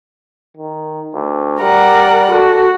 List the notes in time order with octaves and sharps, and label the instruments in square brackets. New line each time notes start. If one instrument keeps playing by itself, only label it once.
[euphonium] D#3
D2
[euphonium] G3 [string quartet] A#4 D5 F#5
[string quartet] F#4 [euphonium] A4